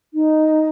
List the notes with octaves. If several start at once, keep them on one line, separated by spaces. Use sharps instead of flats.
D#4